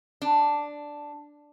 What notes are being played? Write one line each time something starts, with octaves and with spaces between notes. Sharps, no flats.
D4